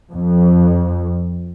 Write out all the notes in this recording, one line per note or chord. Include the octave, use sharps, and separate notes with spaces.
F2